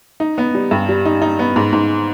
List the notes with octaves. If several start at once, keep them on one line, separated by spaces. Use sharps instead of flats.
D#4
B3
G3
G2
G3
D#4
D#4
B3
G#2
G#2